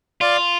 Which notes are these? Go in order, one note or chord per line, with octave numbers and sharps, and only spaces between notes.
F4 D5 F5